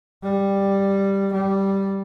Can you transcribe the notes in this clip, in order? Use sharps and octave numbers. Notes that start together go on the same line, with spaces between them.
G3
G3